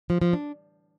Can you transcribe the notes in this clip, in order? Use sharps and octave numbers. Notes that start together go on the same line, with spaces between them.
F3
F3
D4